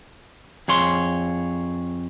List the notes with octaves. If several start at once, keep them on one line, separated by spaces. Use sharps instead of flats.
F2 G#4 C#5 C6